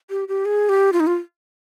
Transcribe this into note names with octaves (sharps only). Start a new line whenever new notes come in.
G4
G4
G#4
G4
F4
D#4
F4